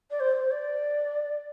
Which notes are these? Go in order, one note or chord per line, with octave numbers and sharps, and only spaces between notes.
D5
C5
C5
D5